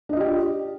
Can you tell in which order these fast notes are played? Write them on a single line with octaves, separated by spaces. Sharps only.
D4 D#5 F4 G4